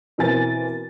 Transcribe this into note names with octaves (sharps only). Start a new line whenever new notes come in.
B2 E3 C4 A#4 G#5 A6